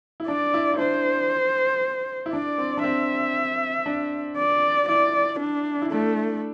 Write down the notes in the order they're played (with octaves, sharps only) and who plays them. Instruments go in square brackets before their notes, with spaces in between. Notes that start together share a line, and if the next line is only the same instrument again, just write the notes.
[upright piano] E4
[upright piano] D4 [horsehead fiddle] D5
[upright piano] E4
E4
[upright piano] D4 [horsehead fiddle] C5
[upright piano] E4
[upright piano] D4 [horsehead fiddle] D5
[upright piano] C4
D4
[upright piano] C4 [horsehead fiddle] E5
[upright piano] D4
[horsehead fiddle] D5
[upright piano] E4 [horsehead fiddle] D5
[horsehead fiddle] D4
[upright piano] E4
[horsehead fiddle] A3 [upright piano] D4